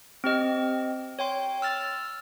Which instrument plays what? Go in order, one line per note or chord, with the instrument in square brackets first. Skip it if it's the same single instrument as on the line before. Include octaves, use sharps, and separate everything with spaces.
[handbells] C4 G4 D#5
C#5 G5 C6
E6 F6 A6